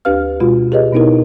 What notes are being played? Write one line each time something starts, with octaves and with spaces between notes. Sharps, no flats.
D2 D4 G4 B4 F5 F6
B2 G#3 F4 F#4
G4 G#4 B4 C#5 D#5
B2 B3 D#4 E4 A#4